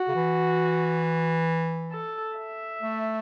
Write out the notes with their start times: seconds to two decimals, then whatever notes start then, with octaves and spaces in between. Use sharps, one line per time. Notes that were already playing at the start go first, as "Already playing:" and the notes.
Already playing: F#4
0.08 C#3
0.15 E3
1.92 A4
2.37 E5
2.81 A3